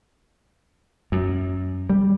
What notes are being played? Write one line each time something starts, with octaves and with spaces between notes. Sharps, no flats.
F#2
G3